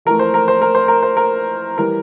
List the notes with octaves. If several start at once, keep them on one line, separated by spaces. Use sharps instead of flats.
F2 E3 A3 A#4
C5
A#4
C5
A#4
C5
A#4
C5
A#4
E3 G3 A#4